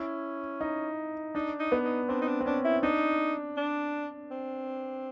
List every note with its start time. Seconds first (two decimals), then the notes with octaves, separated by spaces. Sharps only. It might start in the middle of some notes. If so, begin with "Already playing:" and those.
Already playing: C#4 E4
0.61 D#4
1.35 D4 D#4
1.59 D#4
1.72 B3
1.84 D#4
2.09 C4 D4
2.22 D#4
2.27 D4
2.41 C4
2.46 C#4 D4
2.64 E4
2.83 D4 D#4
3.57 D4
4.31 C4